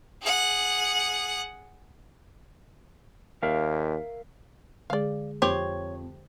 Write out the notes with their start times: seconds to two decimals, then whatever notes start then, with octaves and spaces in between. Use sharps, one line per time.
0.22 G#4 F#5
3.43 D#2 A#4 E5 F5
4.90 D3 G#3 G#4 D5 F5
5.42 F2 C4 G4 C5 C#5